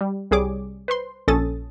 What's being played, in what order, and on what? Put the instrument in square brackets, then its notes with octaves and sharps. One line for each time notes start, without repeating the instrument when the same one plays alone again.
[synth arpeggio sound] G3
C2 G3 G#4 C#5 D6
B4 C5 C6
A#1 C#4 A4 D#6 A6